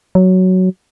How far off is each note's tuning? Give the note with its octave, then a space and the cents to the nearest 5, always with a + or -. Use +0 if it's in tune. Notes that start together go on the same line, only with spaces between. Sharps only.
F#3 +5